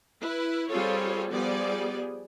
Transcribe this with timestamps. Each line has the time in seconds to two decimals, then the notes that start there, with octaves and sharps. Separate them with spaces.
0.21 E4 B4
0.69 G3 C4 F4 G#4 A4 C#5
1.31 F3 G3 B3 G#4 D5